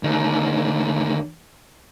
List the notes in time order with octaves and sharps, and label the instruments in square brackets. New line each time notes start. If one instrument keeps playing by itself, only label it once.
[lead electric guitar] D2 D#3